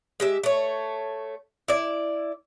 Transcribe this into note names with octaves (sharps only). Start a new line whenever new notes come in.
G#3 G4 E5
A3 C#5
E4 D5